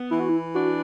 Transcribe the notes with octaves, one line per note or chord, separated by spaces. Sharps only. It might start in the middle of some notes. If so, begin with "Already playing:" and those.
Already playing: B3
E3 E4
F#4
E4
D4 F#4